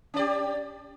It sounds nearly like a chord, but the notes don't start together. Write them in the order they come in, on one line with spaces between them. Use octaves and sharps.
C#4 D5 G4